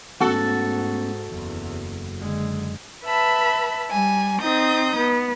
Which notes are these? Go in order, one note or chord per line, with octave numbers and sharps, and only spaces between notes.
G#2 A3 B3 C#4 F#4 A4
F#1 E2
D3 G#3
B4 E5 A5 B5
G3 G#5
C4 D#4 D#6 G6
B3